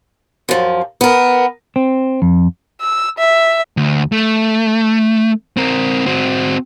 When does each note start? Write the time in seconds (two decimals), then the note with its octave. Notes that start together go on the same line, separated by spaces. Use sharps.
0.49 F#2 F3
1.01 B3 A#4
1.76 C4
2.22 F2
2.81 E6
3.18 E5
3.77 D2
4.12 A3
5.57 C4 A#4
6.06 C4 F#4